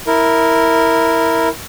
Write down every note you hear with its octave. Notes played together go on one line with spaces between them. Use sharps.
E4 A#4